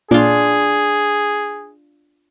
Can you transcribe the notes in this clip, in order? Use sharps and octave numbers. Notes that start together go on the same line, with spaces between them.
A#2 D4 F4 G#4